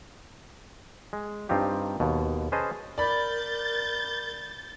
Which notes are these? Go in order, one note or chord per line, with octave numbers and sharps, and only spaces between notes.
G#3
G2 C4 D#4 F4 G4
D#2 B2
C#4 G#4 B4 C5 D#5 A5
A#4 D5 B5 G6 A6